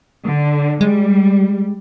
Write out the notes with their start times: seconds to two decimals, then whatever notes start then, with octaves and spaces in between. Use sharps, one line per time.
0.24 D3
0.81 G3 G#3